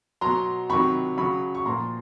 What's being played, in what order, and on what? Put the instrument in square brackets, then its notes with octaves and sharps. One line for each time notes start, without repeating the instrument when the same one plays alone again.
[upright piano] B2 F#3 A#5 C6
C3 D#3 F#3 B5 C#6
C#3 F#3 B5 C#6
C#6
A#2 F3 A#5 C6